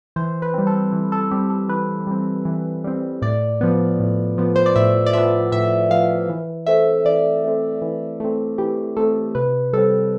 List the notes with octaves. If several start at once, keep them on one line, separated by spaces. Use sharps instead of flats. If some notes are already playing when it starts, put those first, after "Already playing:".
E3 C5
B4
G3 C4
A4
E3
A4
G3 C4 G4
A4
E3 B4
G3 C4
E3
G3 C4
A2 D5
F3 B3
A2
F3 B3
C5
D5
A2 E5
D5
F3 B3 E5
A2 E5
F3 B3 F5
E3
A3 C4 E5
E3 D5
A3 C4
E3
A3 C4
E3 G4
A3 C4 A4
C3 B4
G3 C4 A4